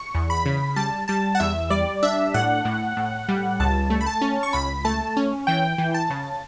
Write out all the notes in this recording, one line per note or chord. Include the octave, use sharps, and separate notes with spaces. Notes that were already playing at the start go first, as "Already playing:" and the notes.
Already playing: C#6
E2
B5
C#3
G3 A5
G3 A5
F#5
E2 E5
G3 D5
D4 E5
A2 F#5
A2
A2
G3
C#2 A5
A3
B5
A5
C#4
C#6
C#2 B5
A3 A5
C#4
E3 G5
E3
A5
C#3